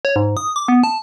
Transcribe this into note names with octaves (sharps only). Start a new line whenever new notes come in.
C#5
G#2
D#6
D6
B3
A5